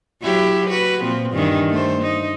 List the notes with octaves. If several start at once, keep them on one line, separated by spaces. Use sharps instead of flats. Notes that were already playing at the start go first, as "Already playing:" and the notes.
F#3 E4 G4
F#4 B4
A#2 F3 C4
G2 D#3 E3
A3 C5
D#4